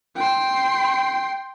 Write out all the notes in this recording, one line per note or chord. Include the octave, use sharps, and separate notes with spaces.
G5 C6